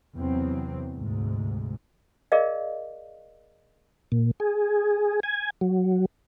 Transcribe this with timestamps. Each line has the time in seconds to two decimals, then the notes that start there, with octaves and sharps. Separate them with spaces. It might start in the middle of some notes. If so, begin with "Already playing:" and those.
0.16 E2 C3 F#3 C4
0.94 D2 G#2 C3
2.32 G#4 A#4 D5 D#5 F5
4.12 A#2
4.40 G#4
5.23 G#5
5.61 F#3